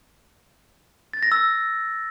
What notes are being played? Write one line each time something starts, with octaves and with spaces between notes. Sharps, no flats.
A6
A#6
E6